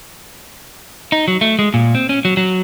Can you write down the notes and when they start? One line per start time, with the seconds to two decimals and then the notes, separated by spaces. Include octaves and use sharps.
1.12 D#4
1.28 F#3
1.41 A3
1.59 G#3
1.74 A#2
1.95 C4
2.09 C#4
2.25 F#3
2.37 F#3